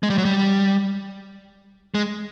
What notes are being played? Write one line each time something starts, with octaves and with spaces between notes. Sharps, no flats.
G#3
G3
F#3
G3
G#3